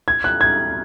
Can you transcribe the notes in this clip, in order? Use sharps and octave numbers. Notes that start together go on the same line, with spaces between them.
G#6
F#6
G#6